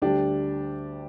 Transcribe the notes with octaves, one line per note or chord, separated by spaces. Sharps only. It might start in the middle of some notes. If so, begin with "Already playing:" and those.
D2 D3 G3 D4 G4